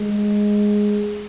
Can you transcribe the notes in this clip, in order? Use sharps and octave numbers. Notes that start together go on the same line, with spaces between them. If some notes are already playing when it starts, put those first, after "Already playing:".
Already playing: G#3